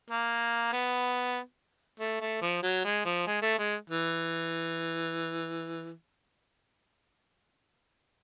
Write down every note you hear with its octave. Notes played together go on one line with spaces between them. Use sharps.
A#3
B3
A3
A3
F3
F#3
G#3
F3
G#3
A3
G#3
E3